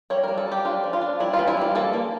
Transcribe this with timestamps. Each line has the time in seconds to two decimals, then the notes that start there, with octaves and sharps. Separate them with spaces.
0.10 G3 C#5
0.23 G3 A#4
0.38 A4
0.47 G3 G4
0.65 D4 F4
0.83 F3
0.93 F4
1.01 D4
1.20 G3 E4
1.33 F4
1.39 E3
1.48 E4
1.57 G3 F4
1.75 A#3 A4
1.93 A#3